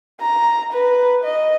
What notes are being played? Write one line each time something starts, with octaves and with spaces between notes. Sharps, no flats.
A#5
B4
D#5